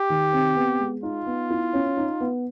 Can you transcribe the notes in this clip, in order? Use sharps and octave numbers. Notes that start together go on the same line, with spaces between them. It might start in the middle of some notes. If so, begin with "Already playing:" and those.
Already playing: G4
D#3
C4
B3
G#3
D#4 F4
B3
E4
C#4
D#4
B3